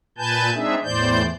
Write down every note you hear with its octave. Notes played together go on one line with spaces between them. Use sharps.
A#2 B4 G#5 A5 G6
G#3 C4 D4 D#4 G#4 E5
E2 A2 E3 C5 D5 G6